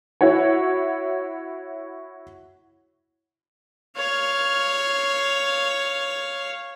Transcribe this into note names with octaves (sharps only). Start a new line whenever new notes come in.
E4 F#4 C#5
C#5 F5